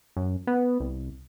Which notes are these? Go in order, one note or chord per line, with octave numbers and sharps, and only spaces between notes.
F#2
B3
C2